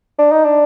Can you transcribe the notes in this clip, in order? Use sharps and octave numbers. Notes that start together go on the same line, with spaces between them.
D4
D#4
D4